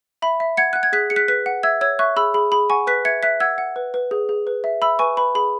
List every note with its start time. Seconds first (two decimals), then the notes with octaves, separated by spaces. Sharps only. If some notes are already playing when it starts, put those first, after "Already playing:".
0.22 E5 B5
0.40 E5
0.57 F#5 G#6 C#7
0.73 F#5 F#6
0.83 G#6
0.93 G#4 F#6 B6
1.10 G#4 C#7
1.16 F#6 B6
1.28 B4 F#6 B6
1.46 F#5
1.63 E5 E6 G#6
1.81 C#5 E6 G#6
1.99 E5 C#6 F#6
2.16 G#4 B5 E6
2.34 G#4 B5
2.52 G#4 B5
2.70 F#5 G#5 C#6
2.87 B4 F#6 B6
3.05 E5 G#6 C#7
3.23 E5 F#6 B6
3.40 F#5 E6 G#6
3.58 F#5
3.76 B4
3.94 B4
4.11 G#4
4.29 G#4
4.47 B4
4.64 E5
4.82 E5 B5 E6
4.99 B4 G#5 C#6
5.17 B4 B5
5.35 G#4 B5